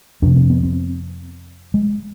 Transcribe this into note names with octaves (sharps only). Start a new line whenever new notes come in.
F2 C3 D4
C4
B3
C4
G#3